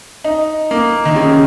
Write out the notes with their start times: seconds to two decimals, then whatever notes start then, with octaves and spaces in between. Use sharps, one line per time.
0.24 D#4
0.71 A#3
1.05 D#3
1.16 C#3